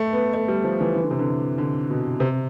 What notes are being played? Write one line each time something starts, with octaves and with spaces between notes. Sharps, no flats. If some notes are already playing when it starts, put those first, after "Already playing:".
Already playing: A3
B3
A3
G3
F3
E3
E3
D3
C3
D3
D3
B2
C3